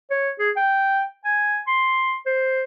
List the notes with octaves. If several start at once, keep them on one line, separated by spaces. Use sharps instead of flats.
C#5
G#4
G5
G#5
C6
C5